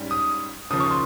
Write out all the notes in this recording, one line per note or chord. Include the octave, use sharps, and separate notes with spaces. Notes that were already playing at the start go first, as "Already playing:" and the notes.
Already playing: G#2 G3 C#4
D#6
D#2 C#3 F3 D#6
C#6
C6